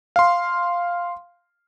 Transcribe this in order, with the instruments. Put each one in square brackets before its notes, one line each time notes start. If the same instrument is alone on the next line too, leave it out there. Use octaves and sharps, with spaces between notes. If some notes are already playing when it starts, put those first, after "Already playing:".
[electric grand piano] F5 C6